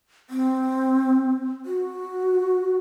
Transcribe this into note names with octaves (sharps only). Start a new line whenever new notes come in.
C4
F#4